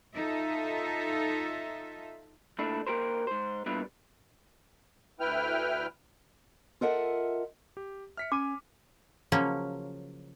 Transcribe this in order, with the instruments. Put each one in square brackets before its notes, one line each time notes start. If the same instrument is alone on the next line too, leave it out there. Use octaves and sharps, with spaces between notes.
[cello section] D#4 F4 A4 E5
[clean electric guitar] A#2 A3 D4 E4
A#3 G4 A#4 C5
G#2 C5
A#2 G3 B3 D4 E4 F4
[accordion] D2 E4 B4 G5 F6
[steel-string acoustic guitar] F4 A4 A#4 D#5 E5 F#5
[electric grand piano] G4
[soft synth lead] E5 [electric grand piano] F6 B6 C#7
[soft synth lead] C#4 [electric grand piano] G#5 D#7 [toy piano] D6
[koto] C#3 F3 F#3 A#3 C#4